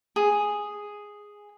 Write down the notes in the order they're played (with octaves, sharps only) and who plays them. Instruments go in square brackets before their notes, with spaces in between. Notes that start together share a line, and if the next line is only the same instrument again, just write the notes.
[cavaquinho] G#4